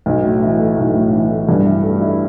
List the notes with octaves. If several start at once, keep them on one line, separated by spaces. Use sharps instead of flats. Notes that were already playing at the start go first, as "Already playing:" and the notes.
B1
A2
E3
A3
B1
A2
E3
A3
G2
E3
A3
E4